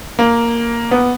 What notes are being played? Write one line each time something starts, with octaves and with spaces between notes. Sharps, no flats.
A#3
B3